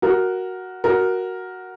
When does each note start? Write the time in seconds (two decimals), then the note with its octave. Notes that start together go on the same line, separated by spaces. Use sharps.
0.02 F#4 A#4
0.84 F#4 A#4